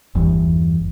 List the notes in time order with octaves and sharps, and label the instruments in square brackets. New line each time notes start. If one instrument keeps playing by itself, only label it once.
[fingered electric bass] G1 E2